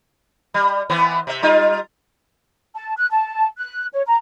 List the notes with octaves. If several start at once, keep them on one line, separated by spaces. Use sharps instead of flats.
G3
E3 B3 C4
C3 E5
G3 D#4 F4
A5
F#6
A5
F#6
C#5
A#5